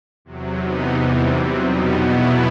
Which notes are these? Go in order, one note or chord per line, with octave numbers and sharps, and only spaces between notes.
E2 C3 F#3
C3 E3 B3 D#4
E2 C3 E3 G3
C3 F#3 C4
E2 B2 G3 B3 D#4
E2 B2 F#3 B3 E4